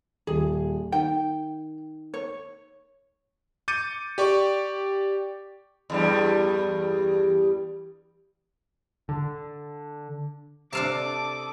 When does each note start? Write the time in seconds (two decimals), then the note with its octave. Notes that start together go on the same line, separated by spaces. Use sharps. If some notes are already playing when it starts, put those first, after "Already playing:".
0.27 D#1 G#4
0.92 D#3 G5
2.14 C#5
3.68 D6 G6 A6 C#7 D#7
4.18 G4 D5 C#6
5.90 E2 G2 G3
9.09 D3
10.73 C3 D4 A4 F5 A5 D6 D#6